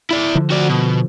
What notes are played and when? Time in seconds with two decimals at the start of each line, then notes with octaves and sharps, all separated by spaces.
0.11 E4 D5
0.35 D3 F3
0.51 F#4 D5
0.69 B2